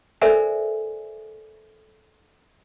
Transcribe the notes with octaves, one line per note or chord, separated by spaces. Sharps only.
A4 A#4 C5 D5 E5 G#5